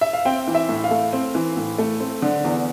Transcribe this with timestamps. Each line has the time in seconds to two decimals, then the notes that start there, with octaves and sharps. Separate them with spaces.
0.01 E5
0.13 F5
0.25 C4 G5
0.48 E3
0.55 E5
0.69 A2
0.84 F5
0.91 A3
1.13 C4
1.35 E3
1.57 A2
1.78 A3
2.00 C4
2.22 D3
2.44 E2